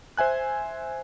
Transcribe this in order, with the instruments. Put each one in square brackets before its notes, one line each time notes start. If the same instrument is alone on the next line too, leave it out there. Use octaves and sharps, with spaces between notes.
[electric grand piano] C5 E5 G#5 F#6